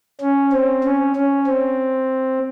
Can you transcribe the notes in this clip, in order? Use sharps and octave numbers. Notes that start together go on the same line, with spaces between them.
C#4
C4
C#4
C#4
C4